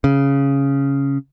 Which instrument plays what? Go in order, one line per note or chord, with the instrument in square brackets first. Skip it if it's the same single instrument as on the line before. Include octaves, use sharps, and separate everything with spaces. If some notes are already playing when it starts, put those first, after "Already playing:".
[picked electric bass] C#3